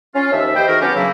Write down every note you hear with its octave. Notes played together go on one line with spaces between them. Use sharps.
C#4 F4
D#2 F3 E5
G4 B4 C5 D#5 E5 G5
D#3 A3 F#4 G#4 A#4
F#3 B3 C#4 D4 F4 G4
C#3 F#3 A#3 E4